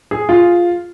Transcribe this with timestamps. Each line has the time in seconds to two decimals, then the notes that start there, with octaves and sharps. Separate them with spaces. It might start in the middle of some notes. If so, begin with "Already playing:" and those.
0.11 G#4
0.29 F4